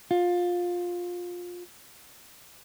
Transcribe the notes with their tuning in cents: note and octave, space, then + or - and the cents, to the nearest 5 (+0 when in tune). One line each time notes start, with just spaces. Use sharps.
F4 +20